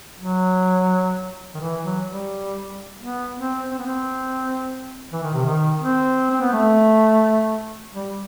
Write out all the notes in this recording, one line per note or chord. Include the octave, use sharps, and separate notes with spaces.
F#3
D#3
E3
F#3
G3
B3
C4
C4
B3
C4
E3
D#3
C3
D#3
C4
C4
B3
A3
G3